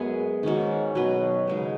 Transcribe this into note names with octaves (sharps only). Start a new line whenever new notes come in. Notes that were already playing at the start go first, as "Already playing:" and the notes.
Already playing: F#2 G#3 B3 G#4 B4
G#2 D#3 G#3 C#4 F#4
B2 F#3 D#4 B4
G#2 C#3 G#3 D#4